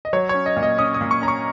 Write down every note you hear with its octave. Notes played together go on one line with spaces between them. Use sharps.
D#5
F#3 C#5
C#4 C#5
D#5
A#2
D#5
C#4 D#6
D#6
A#2
C#6
C#4 A#5
C#6